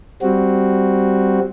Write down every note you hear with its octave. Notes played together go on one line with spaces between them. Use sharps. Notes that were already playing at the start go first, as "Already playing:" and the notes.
G3 C4 F#4